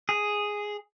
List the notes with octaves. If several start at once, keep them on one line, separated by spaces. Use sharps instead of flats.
G#4